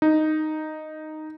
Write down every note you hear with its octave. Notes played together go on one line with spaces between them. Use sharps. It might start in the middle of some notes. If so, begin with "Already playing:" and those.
D#4